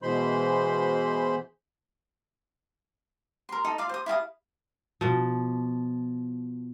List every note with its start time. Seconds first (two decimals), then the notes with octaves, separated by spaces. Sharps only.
0.02 B2 E3 G#3 C5 B5 C6
3.49 A#4 C6
3.64 D#4 A4 D#5 D#6
3.78 F4 D5 F5
3.89 C5 D#6
4.06 E4 F5 G#5 D#6
5.01 B2 F3